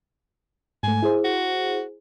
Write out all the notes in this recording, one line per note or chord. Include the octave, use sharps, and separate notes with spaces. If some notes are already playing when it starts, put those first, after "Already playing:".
G#2 A3 G#5
E4 G#4 C5
F#4